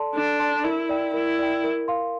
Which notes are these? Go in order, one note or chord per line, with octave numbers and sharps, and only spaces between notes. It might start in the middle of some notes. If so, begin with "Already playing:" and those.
Already playing: A4 D5 A5 C6
D4 A4
D5 A5 C6
E4 A#4
D5 G5
E4 A#4
D5 G5
A#4
F5 C6